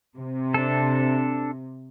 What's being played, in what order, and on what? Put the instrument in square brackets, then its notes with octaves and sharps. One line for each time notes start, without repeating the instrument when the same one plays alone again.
[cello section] C3
[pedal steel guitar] D4 A4